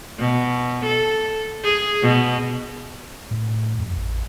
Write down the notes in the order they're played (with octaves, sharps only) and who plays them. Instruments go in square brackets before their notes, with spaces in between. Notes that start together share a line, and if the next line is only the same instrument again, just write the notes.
[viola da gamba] B2
A4
G#4
B2
[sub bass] A2
F2
A1